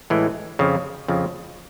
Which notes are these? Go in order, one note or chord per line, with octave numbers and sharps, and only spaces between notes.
A2 E3 G#3
F2 C#3 F3
F2 C#3 F3